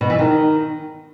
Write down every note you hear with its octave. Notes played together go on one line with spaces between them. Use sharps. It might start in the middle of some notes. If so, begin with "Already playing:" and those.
B2
E3
D#3